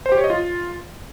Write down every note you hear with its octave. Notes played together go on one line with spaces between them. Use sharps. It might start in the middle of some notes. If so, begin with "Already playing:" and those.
C5
G4
C#5
D#5
F4